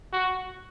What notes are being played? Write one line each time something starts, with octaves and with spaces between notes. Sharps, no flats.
F#4